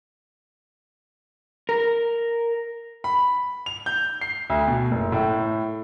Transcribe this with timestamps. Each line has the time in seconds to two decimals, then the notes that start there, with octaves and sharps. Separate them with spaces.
1.69 A#4
3.04 B5
3.66 F7
3.86 G6
4.21 C7
4.50 D2
4.67 B2
4.91 F#1
5.12 A2